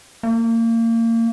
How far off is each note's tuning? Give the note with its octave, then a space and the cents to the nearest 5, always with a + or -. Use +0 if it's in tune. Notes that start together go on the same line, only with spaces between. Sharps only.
A#3 -30